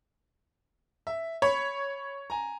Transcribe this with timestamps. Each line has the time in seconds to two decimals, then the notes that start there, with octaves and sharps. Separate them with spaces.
1.07 E5
1.42 C#5 B5
2.30 G#5 A#5